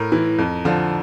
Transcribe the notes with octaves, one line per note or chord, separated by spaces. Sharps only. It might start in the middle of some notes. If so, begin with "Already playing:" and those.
Already playing: A2 A#4
E3
F2
D3 F3